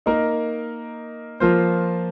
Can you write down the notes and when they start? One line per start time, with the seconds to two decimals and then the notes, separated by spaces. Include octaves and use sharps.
0.06 A#3 D#4 A#4
1.40 F3 A#3 F4 C5